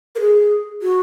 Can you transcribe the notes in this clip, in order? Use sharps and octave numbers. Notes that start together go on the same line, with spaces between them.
A#4
G#4
F#4